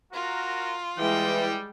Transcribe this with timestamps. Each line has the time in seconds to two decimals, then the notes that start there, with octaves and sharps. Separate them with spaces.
0.13 F4 F#4 A#4
0.99 E3 G3 G#3 G5